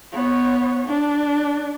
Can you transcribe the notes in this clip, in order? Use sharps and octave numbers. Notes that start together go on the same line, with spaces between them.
B3 C#5
D4